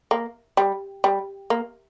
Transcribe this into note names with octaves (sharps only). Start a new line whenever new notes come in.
A#3
G3
G3
A#3